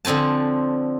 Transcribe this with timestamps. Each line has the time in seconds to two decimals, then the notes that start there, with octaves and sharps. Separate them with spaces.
0.05 D3 F3 C4 G#5 A5